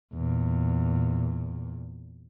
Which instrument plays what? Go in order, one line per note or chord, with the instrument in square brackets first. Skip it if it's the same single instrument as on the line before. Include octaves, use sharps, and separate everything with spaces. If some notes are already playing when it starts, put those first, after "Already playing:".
[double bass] E2 A#2